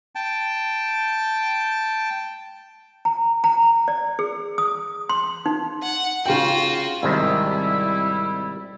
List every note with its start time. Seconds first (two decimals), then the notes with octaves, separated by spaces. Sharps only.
0.15 G5 A5
3.05 A#5
3.44 A#5
3.88 D5
4.19 G#4
4.58 D#6
5.09 C6
5.46 D#4
5.83 F#5
6.26 C#3 F4 F#4 G5
7.03 G#1 C3 D#3 G3 E4